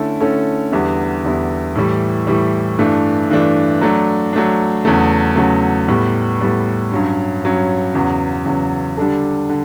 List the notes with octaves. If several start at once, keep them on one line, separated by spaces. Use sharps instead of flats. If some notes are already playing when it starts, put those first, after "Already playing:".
Already playing: D3 A3 C#4 E4 A4
D3 A3 C#4 E4 A4
E2 D3 G3 B3 E4
E2 D3 G3 B3 E4
A2 E3 G3
A2 E3 G3
G2 E3 A3 D4
G2 E3 A3 D4
F#3 A3 D4
F#3 A3 D4
E2 C#3 F#3 A3
E2 C#3 F#3 A3
A2 G3 B3
A2 G3 B3
G2 F#3 C#4
G2 F#3 C#4
E2 C#3 F#3
E2 C#3 F#3
D3 G3 D4 A4
D3